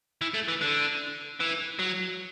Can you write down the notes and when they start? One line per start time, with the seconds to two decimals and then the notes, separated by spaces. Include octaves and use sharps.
0.21 E3
0.34 A3
0.48 E3
0.62 D3
1.40 E3
1.79 F#3